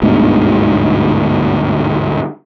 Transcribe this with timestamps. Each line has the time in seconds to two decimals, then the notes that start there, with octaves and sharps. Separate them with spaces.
0.02 G1 D2 G#2 B2